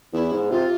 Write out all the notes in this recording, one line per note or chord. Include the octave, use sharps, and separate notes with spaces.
E2 E4
G#2
C3 F4